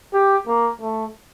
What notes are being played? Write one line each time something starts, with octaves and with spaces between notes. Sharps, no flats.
G4
A#3
A3